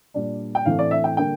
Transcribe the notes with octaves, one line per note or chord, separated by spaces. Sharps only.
A#2 G3 D4
G5
A2 E3 A3 C4 F5
D5
E5
G5
D3 G3 A#3 D4 G5